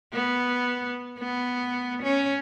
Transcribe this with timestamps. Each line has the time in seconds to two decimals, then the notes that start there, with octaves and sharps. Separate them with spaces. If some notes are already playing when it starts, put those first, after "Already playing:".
0.13 B3
1.19 B3
2.03 C#4